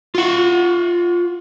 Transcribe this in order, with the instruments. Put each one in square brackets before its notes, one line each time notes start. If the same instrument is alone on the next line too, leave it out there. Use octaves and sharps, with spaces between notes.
[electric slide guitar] F4 F#5